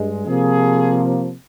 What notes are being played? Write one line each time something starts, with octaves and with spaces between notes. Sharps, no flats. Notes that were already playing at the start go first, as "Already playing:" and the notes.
Already playing: G2 G#3
C3 F3 A#3 G#4